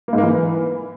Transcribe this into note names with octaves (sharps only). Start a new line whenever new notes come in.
A#3
G#2
A#3
E3